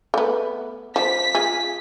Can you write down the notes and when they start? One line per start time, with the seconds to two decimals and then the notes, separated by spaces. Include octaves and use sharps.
0.14 A3 B3
0.96 F3 B6
1.35 F4 G#4